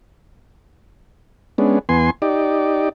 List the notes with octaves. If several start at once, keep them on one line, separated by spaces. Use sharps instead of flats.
G#3 B3 C#4 D4
E2 B3 G#5 C6
D#4 G4 D5